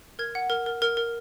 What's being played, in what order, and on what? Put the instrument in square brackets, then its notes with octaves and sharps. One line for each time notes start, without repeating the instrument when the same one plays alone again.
[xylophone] A#4 G#6
F#5
A#4
A#4
A#4
A#4